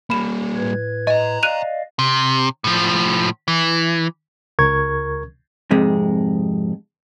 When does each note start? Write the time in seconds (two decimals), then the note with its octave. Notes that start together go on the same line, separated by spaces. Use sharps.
0.10 G3 A#3 B5 E7
0.55 A2 B4 G#6
1.07 D#5 G#5 A#5
1.43 D5 D#5 F5 F#6 D#7 F7
1.99 C3
2.64 A2 F3
3.48 E3
4.59 C#2 A#4 C#6 G#6
5.71 F2 G#2 C3 G#3